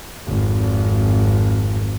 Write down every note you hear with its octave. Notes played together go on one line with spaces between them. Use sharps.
G#1 F2